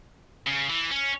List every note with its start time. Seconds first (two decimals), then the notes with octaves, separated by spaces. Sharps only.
0.47 C#3
0.69 E3
0.91 C#4